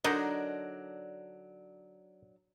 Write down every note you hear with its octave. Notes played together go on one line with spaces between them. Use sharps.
D3 F#3 D4 D#4 A#4